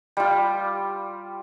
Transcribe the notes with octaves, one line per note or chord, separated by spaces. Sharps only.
G3 F4